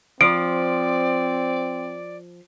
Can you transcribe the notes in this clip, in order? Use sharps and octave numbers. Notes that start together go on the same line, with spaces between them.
F3 C4 D5 D7